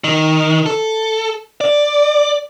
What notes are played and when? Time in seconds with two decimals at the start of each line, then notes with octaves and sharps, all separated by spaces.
0.04 D#3
0.66 A4
1.61 D5